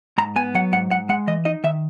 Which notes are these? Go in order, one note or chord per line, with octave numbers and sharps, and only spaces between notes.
G#2 A#5
B3 G#5
F#3 F#5
G#2 F#5
G#2 F#5
G#3 F#5
E3 D#5
D#4 D#5
D#3 E5